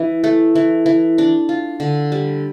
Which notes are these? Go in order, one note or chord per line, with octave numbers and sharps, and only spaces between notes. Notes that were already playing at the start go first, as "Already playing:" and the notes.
Already playing: E3
A3
E3
E3
D4
F4
D3
G3